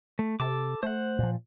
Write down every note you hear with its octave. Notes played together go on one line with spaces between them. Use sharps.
A3
C3 A4 A5 D6
A3 C5 F#5
A#2 F3